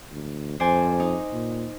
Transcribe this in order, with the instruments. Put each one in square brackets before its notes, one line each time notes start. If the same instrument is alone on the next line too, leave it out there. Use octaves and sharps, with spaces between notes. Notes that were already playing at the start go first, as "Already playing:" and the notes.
[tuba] D2
[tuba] F2 [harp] C5 D5 G#5
[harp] D#4
[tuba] A#2